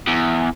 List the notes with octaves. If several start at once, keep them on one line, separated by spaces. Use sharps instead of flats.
E2